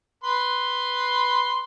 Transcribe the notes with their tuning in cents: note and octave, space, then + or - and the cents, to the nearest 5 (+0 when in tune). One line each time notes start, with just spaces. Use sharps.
B4 +0 C6 +0